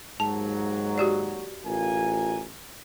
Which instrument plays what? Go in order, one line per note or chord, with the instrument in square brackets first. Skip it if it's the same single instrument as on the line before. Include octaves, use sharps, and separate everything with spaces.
[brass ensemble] D#2 F#3 [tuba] G#2 [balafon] A5
[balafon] F#4 G4 D5
[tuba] A1 [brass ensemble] F4 A#4 G#5